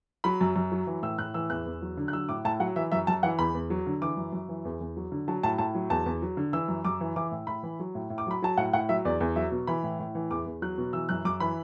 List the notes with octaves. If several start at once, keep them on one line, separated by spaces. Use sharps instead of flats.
F#3 B5
F#2
F#2
F#3
E3
A2 E6
A2 F#6
E3 E6
E2 F#6
E2
F#3
D3
F#6
F#3 E6
A2 D6
A2 A5
F#3 F#5
E3 E5
F#2 E5
F#2 A5
E3 F#5
E2 B5
E2
F#3
D3
E3 D6
F#2
F#2
E3
E2
E2
F#3
D3
F#3 A5
A2 A5
A2 A5
F#3
E2 A5
E2
F#3
D3
E3 E6
F#2
F#2 D6
E3
E3 D6
A2
A2 B5
E3
F#3
A2
A2
D6
F#3 B5
F#3 A5
A2 F#5
A2 F#5
F#3 E5
E2 D5
E2
F#3 E5
B2
E3 B5
A2
A2
E3
E2 D6
E2
F#3 F#6
B2
E3 E6
F#2 F#6
F#2 D6
E3 B5